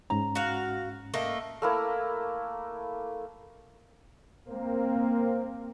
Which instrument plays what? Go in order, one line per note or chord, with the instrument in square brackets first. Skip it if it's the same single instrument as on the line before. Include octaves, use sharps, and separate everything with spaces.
[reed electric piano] G#2 C#4 [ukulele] A#5
[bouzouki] F#4 F5
A3 A#3 D#5
[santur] A3 A#3 E4
[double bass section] A#3 C4